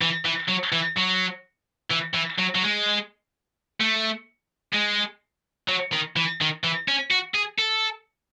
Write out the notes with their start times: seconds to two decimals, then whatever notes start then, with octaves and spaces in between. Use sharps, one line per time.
0.01 E3
0.25 E3
0.49 F#3
0.72 E3
0.97 F#3
1.91 E3
2.15 E3
2.39 F#3
2.55 F#3
2.62 G#3
3.81 A3
4.74 G#3
5.69 F#3
5.93 D#3
6.16 E3
6.41 D#3
6.64 E3
6.88 C#4
7.11 F#4
7.34 G#4
7.59 A4